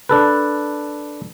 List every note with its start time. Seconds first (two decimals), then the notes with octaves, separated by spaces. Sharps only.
0.09 D4 A4 B4